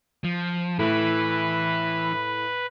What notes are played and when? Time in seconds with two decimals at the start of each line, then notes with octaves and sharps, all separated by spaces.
0.24 F3
0.79 A2 E3 B4